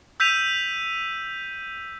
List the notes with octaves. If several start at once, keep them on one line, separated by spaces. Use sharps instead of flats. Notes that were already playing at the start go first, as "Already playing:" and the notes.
E6 G6 B6 D#7 F7